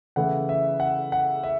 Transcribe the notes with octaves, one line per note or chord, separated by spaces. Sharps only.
C#3 E3 A3 E4 F#5
E5
F#5
F#5
E5